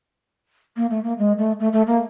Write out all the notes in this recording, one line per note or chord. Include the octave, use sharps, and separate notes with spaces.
A#3
A3
A#3
G#3
A3
A3
A3
A#3